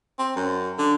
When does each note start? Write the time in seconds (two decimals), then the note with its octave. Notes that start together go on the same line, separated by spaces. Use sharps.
0.18 C4
0.36 F#2
0.78 D3